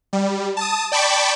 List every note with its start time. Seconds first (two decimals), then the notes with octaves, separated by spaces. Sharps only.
0.13 G3
0.57 A5 D#6
0.92 D5 G5 A5 B5 C#6 D6